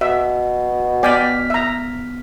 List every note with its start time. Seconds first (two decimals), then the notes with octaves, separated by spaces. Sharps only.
0.01 B2 E5
1.03 B3 D5 G5 G#5 F6 B6
1.50 E5 A#5